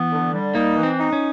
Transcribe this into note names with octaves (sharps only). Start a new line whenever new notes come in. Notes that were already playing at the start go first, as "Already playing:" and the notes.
Already playing: E3 B3
D3
G3
A#3 D#4
E3
C4
D#4
C#4